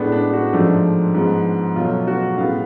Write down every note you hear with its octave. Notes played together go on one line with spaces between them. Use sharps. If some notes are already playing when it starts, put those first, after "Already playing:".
Already playing: A2 G#3 B3 D4
D4
F#4
G#2 F3 A3 D4
G#2 F3 G#3 B3
B2 F#3 A3 F4
F#4
A2 G#3 B3 F5